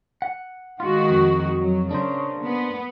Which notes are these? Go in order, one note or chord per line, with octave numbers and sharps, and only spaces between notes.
F#5
D#3 G#3 F4 F#4
F2
F#3
C#3 D4 A#4 C5
B3